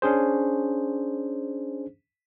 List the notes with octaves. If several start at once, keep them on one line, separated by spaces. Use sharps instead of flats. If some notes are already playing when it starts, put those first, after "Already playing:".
C#4 D4 G#4 C5